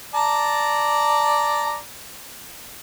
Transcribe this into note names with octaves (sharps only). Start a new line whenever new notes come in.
D5 A5 A#5